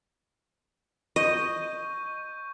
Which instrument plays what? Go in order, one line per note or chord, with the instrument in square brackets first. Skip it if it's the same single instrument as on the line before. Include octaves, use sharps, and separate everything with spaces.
[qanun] D#5 [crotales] C#6 G6 D#7